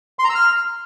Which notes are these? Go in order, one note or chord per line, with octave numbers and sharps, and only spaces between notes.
C6
A#5
E6
F6